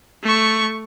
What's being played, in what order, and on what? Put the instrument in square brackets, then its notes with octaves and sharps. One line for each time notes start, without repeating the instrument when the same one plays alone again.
[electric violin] A3 C#6